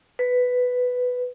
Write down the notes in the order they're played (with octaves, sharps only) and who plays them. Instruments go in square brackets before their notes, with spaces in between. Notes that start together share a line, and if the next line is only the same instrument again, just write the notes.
[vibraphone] B4